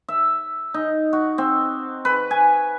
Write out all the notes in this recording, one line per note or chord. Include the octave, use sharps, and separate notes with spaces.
E5
D#4
F#4
C4
B4
G#5